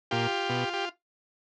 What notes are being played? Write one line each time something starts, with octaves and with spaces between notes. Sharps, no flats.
A#2 F4 G4
B2
G4